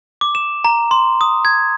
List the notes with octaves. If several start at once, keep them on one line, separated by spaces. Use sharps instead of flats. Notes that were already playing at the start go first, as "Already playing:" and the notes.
D6
E7
A#5
C6
D#6
G#6